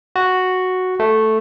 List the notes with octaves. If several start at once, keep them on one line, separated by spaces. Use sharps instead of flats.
F#4
A3